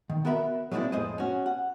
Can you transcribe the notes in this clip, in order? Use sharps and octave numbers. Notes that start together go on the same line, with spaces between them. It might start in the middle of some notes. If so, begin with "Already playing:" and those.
D#3
B3 F#4 A#4 E5 B5
F#3 G#3 A#3 C4 D4 E4
F2 A2 G#3 G#4 C5 D#5
C#4 F#4
F#5